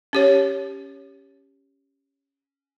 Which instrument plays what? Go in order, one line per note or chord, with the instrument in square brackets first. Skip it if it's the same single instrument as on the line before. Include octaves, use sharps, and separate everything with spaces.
[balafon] C#4 G4 C#5